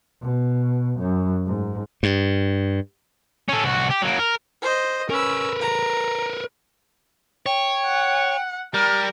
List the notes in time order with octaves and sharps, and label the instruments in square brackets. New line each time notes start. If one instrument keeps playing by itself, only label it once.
[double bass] B2
F#2
G#2
[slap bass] G2
[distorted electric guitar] C#4 A4
C2 F#4
G4
F#3 A#3
A#4
[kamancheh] C5 D#5
[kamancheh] C#4 E6 [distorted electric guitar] A#4 B4
[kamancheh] A#5
[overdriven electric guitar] C#5 [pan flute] G5
[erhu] F#5
[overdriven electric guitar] G3 [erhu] A#4 [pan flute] F6